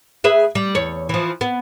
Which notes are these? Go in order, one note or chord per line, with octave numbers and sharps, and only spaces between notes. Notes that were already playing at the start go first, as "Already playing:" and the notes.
G#4 B4 E5
G3
E2 C#5
E3 F3
B3